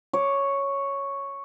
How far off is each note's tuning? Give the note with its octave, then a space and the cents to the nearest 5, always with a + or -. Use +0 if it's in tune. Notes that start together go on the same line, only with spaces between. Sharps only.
C#5 +0 D6 +0